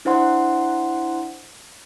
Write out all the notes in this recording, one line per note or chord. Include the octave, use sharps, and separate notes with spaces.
D4 E4 C5 F#5 C6